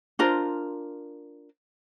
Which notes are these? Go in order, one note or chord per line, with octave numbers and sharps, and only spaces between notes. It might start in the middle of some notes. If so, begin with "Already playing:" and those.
D4 F4 A#4 C5